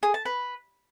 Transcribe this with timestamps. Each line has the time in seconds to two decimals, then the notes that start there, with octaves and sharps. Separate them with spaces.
0.03 G#4
0.14 A5
0.25 B4